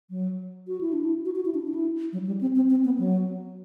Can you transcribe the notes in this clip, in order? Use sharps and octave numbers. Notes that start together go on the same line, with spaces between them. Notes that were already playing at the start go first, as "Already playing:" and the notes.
F#3
F#4
E4
D4
E4
F#4
F#4
E4
D4
D4
E4
F#3
G3
C4
C4
C4
B3
F#3